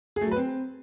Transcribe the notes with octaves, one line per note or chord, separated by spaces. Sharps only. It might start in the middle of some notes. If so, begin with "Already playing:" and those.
G#4
A3
F#3
B4
C4